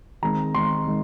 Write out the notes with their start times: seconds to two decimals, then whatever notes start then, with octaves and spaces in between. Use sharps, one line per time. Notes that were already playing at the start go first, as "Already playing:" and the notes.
0.22 D#3 G#3 C4 A#5
0.54 D#3 G#3 C4 C6
0.87 D#3 G#3